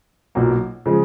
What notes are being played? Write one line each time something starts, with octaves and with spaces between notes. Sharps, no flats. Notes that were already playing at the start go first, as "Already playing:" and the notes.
B1 A#2 F#3 A#3
C#3 F3 G#3